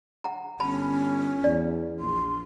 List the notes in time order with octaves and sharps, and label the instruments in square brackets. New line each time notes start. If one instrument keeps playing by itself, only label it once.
[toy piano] F#5 A#5
[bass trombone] G1 [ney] C#4 [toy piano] A5 B5
[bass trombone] E2 [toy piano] D5
[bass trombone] A#1 [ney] C6